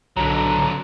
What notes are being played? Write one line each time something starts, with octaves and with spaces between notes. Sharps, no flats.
B1 D3 F#3 A#5